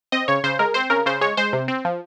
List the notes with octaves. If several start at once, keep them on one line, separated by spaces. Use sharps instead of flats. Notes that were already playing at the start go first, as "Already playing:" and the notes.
C4 D#5
C#3 C#5
C#3 C5
G#3 A#4
C4 C5
C#3 A#4
C#3 C5
G#3 C#5
G#3 C5
C3
C4
F3